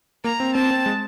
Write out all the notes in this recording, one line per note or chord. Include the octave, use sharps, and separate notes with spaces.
A#3 A#5
C4
C4 A5
C4
G#3